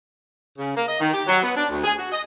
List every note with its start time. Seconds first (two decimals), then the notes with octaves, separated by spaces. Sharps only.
0.58 C#3
0.77 A#3
0.88 D#5
1.00 D#3
1.13 G4
1.27 F#3
1.43 B3
1.56 D4
1.70 D2
1.84 G#4
1.98 F#4
2.12 D#5